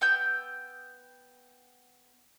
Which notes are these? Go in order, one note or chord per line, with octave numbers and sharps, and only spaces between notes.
B3 G5 E6 G6